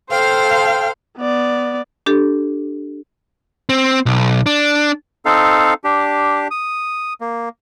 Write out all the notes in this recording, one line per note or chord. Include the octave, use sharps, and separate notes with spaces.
A4 C5 F5 G5 F6
B3 D5
D4 G4 A4
C4
B1
D4
C4 D#4 A4 F5
D4 G4
D#6
A#3